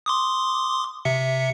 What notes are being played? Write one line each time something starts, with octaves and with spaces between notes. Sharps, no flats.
C6 D6 D#6
C3 E5 C#7